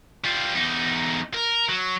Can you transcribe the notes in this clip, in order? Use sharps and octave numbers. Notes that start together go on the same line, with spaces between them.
G3 F4
E2 D#4
A#4
F#3